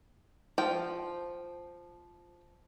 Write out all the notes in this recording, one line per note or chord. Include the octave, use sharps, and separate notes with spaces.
F3 G5